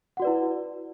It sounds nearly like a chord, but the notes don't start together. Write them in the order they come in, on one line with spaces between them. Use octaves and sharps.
F#5 F#4 D5 B4 E4